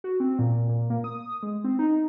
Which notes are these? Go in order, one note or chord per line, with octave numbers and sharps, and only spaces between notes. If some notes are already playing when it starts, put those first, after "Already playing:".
F#4
C4
A#2
A#2
A#3
D#6
G#3
C4
D#4